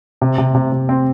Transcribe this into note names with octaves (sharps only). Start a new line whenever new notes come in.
C3
C3
C3
C3
C4